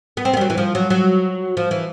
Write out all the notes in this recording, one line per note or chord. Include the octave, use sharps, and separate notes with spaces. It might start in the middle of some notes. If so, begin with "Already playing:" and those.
B3
C4
B3
G3
F#3
E3
F3
F#3
F#3
F3
E3